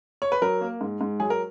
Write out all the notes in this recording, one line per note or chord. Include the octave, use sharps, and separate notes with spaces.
C#5
B4
F#3 A#4
A#3
G#2
G#2
F#3 G#4
A#4